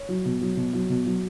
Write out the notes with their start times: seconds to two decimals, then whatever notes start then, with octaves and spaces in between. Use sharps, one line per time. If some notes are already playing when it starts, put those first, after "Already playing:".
Already playing: C#5
0.09 F#3
0.25 B2
0.41 F#3
0.57 B2
0.73 F#3
0.90 B2
1.06 F#3